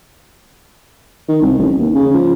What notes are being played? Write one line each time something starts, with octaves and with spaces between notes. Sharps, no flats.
D#3
C2
A1
D#2
C#3
F3